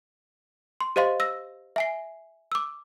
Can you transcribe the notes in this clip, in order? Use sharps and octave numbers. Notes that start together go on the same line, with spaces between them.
C6
G4 C5 D#5 F5 C6
E6 A#6
E5 G#5 C7
D6 E6